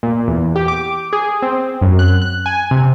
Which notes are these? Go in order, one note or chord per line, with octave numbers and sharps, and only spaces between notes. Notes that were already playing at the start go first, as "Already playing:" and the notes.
A#2
E2
G4
D6
G#4
C4
F#2
F#6
F#6
G#5
C3